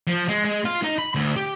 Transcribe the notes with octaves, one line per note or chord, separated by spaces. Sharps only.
F3
G#3
G#3
F4
D#4
B5
D2
G4